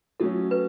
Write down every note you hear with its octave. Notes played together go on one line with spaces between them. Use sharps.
F#3 A3 C#4 A4
B4